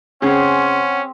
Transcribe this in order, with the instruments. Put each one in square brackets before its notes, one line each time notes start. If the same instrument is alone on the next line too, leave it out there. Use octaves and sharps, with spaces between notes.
[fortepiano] C#3 [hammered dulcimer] C4 G#4 [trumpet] C#4 [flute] F#5